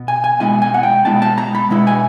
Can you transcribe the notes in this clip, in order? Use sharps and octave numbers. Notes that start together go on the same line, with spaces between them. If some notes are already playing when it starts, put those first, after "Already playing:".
Already playing: B2 B3
G#5
G#5
B2 G#3 B3 E4 G#5
G#5
F#5
G5
B2 G#3 B3 E4 A5
A5
A#5
B5
B2 G#3 B3 E4
G#5